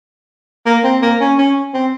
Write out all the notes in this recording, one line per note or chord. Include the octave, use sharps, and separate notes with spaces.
A#3
C4
A#3
C#4
C#4
C4